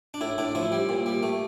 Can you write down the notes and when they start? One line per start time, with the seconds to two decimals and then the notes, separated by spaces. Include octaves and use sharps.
0.14 D4
0.21 A2 E4
0.38 A2 D4
0.55 F3 E4
0.72 G3
0.89 A#2
1.06 G3
1.23 A3